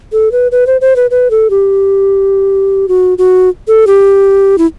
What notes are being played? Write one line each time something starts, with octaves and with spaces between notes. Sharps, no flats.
A4
B4
B4
C5
C5
B4
B4
A4
G4
F#4
F#4
A4
G4
E4